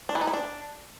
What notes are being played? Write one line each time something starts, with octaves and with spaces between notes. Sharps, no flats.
D4
E3
D#4
E4
D4